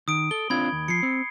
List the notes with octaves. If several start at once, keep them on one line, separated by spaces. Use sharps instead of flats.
D#3 D#6 D7
A4 G7
C4 D4 F4 B5 G#6
D#2
F3 C7 C#7
C4